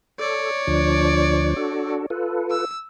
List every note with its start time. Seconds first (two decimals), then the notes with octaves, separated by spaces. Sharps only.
0.19 A4 C#5 D5
0.67 D2 F3 D4
1.56 D4 F#4 A4
2.10 F4 A4 B4
2.51 E6